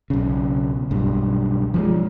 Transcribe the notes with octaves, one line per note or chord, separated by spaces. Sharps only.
B1 C#3
B1 G2
F3 F#3 G#3